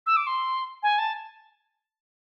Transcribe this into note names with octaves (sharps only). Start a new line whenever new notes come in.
E6
D6
C6
G#5
A5